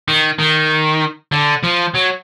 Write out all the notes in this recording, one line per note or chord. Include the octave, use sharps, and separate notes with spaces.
D#3
D#3
D3
F3
F#3